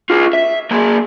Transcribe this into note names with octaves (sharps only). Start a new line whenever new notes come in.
F4 G#4
E5
A#3 G#4